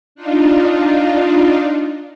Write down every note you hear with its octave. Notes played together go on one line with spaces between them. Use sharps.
D4 D#4 F4